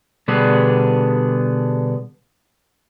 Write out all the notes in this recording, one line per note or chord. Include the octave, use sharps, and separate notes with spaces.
B2 D3 G3 B3 D4 G#4